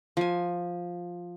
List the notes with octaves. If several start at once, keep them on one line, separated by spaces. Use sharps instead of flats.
F3 G#5